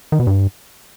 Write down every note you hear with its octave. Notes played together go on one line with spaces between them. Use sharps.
D#3
B2
G2